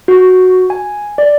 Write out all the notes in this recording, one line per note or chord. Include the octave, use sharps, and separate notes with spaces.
F#4
G#5
D5